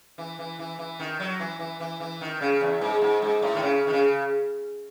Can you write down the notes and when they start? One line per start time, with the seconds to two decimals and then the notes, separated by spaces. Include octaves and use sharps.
0.18 E3
0.39 E3
0.59 E3
0.79 E3
0.99 D#3
1.20 F#3
1.40 E3
1.59 E3
1.80 E3
2.00 E3
2.21 D#3
2.41 C#3
2.61 E2
2.81 G#2
3.02 G#2
3.22 G#2
3.42 A2
3.55 D#3
3.63 C#3
3.87 D#3
3.93 C#3